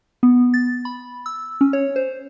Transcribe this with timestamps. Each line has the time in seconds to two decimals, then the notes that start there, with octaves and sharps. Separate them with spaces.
0.23 B3
0.54 A6
0.85 B5
1.26 E6
1.61 C#4
1.73 C#5
1.96 C5